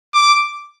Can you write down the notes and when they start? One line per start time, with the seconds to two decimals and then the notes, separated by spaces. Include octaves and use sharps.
0.14 D6